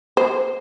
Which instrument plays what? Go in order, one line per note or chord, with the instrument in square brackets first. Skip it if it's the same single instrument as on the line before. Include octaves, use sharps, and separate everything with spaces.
[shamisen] C5